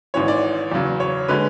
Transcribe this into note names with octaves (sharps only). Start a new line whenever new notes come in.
G#1 G#2 E3 C#5
D5
E2 C#3 F#3
C#5
D3 G#3 B4